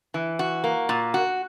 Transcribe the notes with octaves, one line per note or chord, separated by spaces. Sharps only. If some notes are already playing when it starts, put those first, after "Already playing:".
E3
F#4
A#3
A#2
F#4